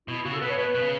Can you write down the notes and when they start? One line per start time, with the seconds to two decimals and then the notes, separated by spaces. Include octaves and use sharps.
0.08 B2 E4
0.25 C#3 F#4
0.33 A4
0.41 B2 B4
0.50 C#5
0.58 B2 B4
0.75 B2
0.82 C#3